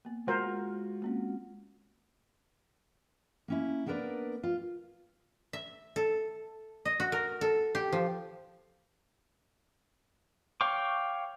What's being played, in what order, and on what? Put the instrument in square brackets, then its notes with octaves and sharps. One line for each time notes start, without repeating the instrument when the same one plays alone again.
[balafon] A#3 B3
[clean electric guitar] G#3 F4 F#4 [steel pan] A#4 C5
[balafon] A#3 C4 C#4
[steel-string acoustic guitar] A#3 C#4 E4
A#3 B3 D4 A#4 B4 D5
F4
[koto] E5
A4
D#5
F#4
A#4
A4
G4
F3
[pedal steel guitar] C#5 F5 G5 C#6 D6